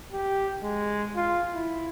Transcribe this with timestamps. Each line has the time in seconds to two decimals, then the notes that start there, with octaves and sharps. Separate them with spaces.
0.12 G4
0.63 G#3
1.16 F4
1.53 E4